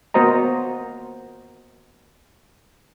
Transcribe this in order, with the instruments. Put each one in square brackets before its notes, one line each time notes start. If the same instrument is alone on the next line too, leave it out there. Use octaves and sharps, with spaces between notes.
[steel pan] A#3 B3 F#4 C5 D#5 A#5